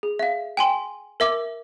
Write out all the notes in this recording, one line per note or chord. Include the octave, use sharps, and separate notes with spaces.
G#4
E5 F5
G5 G#5 C6
A#4 E5 D6